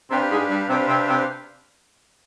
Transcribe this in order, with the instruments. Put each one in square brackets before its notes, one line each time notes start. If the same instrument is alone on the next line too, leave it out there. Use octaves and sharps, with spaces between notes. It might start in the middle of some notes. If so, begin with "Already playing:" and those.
[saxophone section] C3 C4 [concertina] D4 G4 B4 F5
[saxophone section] G#2 G#3
G2 G3
[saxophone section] C3 C4 [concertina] D4 G4 B4 F5
[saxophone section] C3 C4
C3 C4